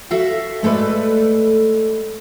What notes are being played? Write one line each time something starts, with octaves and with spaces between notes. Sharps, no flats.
F#4 A4 E5 F5
G#3 A3 A4 B4 D5